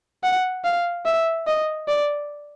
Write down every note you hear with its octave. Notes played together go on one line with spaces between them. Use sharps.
F#5
F5
E5
D#5
D5